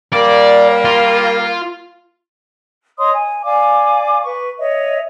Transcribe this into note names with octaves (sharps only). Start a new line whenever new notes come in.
G3 A#3 D5
F4
C#5 D#5 C6 D#6
G#5
D5 F5 G#5 D6
B4 C#6
C#5 D#5 E5